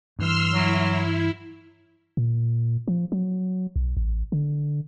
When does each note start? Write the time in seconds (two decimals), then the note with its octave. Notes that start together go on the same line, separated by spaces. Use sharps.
0.19 G2 E3 C6 E6 F6
0.53 F#3 E4
2.17 A#2
2.88 F3
3.12 F#3
3.76 B1
3.97 A1
4.32 D3